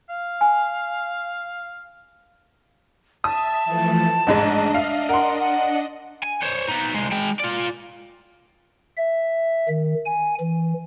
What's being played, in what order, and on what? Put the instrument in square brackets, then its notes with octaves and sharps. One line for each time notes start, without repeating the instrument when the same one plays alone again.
[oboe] F5
[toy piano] G#5
[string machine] E5 [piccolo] A5 [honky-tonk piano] D#6
[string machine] E3 F3 A3
[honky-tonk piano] A1 G#2 G#3 [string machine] D4 D#5
[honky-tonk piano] E5 F5
[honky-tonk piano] A#4 C6 [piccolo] F#5
[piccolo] F#5
[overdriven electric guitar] G#5
C5 C#5
B3 D#4
C2 G#3
G#3 G5
F4 D5
[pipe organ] E5
D#3
G#5
E3